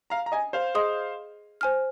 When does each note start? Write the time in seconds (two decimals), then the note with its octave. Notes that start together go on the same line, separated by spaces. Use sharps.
0.10 F5 A#5
0.26 A#5
0.32 D#5 G#5
0.53 C5 F5
0.75 G#4 D#5 C6 D#6
1.61 C5 G#5 F6